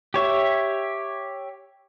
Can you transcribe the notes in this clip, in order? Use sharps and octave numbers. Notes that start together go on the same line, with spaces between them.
G4 C#5 E5